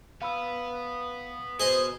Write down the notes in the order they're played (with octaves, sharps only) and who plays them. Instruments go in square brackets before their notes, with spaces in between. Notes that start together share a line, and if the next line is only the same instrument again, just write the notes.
[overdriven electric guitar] B3 [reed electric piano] F5 B5 E6
[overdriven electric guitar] B2 [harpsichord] G#4 D#5 G#5 [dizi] C5